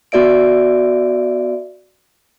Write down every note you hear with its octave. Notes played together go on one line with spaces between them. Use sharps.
B3 F#4 D5 E5 D7